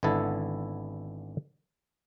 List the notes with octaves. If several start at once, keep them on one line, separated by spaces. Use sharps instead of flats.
G#1 D3 B3 E4 A4